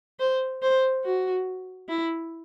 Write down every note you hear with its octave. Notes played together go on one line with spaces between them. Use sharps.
C5
C5
F#4
E4